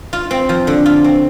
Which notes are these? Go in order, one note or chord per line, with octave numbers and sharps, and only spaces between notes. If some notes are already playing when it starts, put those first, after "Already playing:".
F4
C4
F3
D3
F4
C4